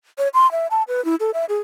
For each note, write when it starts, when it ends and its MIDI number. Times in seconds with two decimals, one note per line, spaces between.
0.18 0.28 73
0.34 0.50 84
0.51 0.67 76
0.71 0.83 81
0.88 1.03 71
1.05 1.15 64
1.20 1.31 69
1.34 1.45 76
1.49 1.58 68